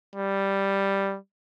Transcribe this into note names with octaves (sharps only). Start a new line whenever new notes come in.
G3